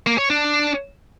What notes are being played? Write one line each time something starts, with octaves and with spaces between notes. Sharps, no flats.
A#3
C#5
D4